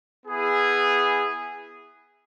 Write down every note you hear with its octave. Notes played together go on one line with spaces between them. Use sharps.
B3 E4 G#4